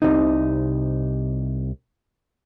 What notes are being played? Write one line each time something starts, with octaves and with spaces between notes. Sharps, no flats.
C2 C3 D#4